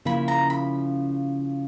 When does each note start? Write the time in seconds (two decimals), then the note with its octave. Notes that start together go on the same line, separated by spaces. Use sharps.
0.05 C#3 F3 A#3 C#4 E4 B5
0.28 A#5
0.50 B5